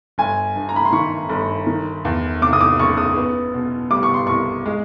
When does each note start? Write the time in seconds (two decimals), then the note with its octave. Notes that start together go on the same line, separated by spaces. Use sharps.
0.18 G1 G#5
0.56 G2
0.69 A#5
0.76 B5
0.85 C6
0.92 D#3 C#6
1.29 G1
1.67 D#3
2.05 E2
2.41 C3 D6
2.53 D#6
2.60 D6
2.79 F#1 C#6
2.97 D#6
3.16 B3
3.54 B2
3.91 G3 D6
4.03 C#6
4.14 C6
4.27 C2 C#6
4.66 G#3